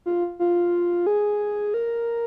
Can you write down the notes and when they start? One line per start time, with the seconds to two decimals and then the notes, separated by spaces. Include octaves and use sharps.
0.06 F4
0.39 F4
1.07 G#4
1.74 A#4